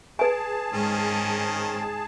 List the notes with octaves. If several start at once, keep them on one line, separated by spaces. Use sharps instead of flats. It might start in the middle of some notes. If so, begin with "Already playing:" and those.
G#4 B4 G#5 A5
G#2 D#3 C4 C#4